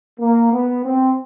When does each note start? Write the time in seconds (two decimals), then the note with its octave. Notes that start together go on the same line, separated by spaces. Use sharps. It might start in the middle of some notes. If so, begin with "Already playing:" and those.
0.20 A#3
0.52 B3
0.84 C4